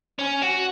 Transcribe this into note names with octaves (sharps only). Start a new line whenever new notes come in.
C#4
F#4